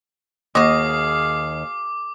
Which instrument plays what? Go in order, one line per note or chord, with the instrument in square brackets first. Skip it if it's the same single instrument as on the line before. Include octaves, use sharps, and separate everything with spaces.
[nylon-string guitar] D#2 [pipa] F#4 D#5 [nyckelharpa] G#4 F5 [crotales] D6